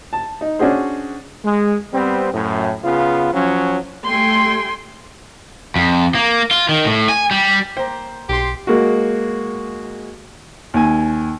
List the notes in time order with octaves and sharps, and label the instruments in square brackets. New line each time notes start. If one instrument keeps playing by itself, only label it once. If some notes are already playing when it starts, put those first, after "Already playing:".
[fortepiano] A5
D#4
C#4 D4 F#4 G#4 C5
[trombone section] G#3
G3 B3 C4
F#2 A2
C#3 B3 F4
F3 F#3 C#4
[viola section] G3 A3 G5 G#5 C6
[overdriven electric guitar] F2
A#3
F4
D#3
A2
G#5
G3
[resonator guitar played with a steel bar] A#3 G5 [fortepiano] C5
[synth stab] B1 C6 [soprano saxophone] G4
[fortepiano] G#3 A#3 F#4
D#2 G#5